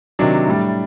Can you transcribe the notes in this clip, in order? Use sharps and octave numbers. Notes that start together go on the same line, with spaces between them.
C3 D#3 F#3 D4
A2 G3